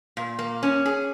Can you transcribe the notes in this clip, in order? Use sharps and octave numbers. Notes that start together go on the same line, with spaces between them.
A#2
A#3
C#4
G#4